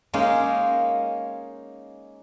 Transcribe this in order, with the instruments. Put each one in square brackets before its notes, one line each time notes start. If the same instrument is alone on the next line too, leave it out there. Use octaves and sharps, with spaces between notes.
[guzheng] G#3 A#3 C#4 D#4